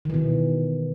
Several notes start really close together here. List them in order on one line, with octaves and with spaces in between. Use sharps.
D#3 E3 B2